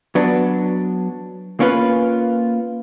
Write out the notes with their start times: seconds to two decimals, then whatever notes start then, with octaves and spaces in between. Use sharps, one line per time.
0.15 F#3 B3 D4
1.60 A#3 C#4 F4 B4